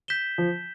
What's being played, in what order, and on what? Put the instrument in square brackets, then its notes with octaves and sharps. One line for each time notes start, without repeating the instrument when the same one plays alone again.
[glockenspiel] G6 B6 E7 G7
[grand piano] F3